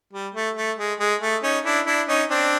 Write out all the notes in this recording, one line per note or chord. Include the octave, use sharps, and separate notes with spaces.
G3
A3
A3
G#3
G#3
A3
C#4 D#4
D4 E4
D4 E4
C#4 D#4
C4 D4